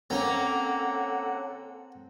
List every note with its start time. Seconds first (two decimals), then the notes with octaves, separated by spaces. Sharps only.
0.10 A#3 C4 C#4 A4 A#4 F#5